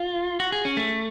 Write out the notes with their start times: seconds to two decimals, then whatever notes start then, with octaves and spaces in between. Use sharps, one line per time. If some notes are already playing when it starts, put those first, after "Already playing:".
Already playing: F4
0.40 F#4
0.52 G#4
0.65 C#4
0.77 A3